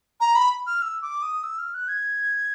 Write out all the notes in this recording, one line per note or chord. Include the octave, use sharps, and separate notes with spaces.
A#5
B5
F6
E6
D6
D#6
E6
F6
F#6
G#6